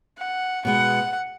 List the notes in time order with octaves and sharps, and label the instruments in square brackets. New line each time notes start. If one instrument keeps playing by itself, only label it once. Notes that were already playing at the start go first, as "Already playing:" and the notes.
[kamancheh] F#5
[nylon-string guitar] B2 G#3 B3 [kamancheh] F#5